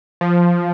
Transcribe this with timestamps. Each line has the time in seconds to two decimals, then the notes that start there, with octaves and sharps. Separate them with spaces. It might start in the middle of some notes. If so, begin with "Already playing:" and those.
0.21 F3